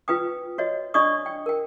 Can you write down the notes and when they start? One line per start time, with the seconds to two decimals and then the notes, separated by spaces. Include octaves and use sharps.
0.08 F4 B4 G5 D#6
0.58 F#4 C#5 D#5
0.94 D4 D5 D#5 C#6 D#6
1.26 G5
1.46 A#4 G5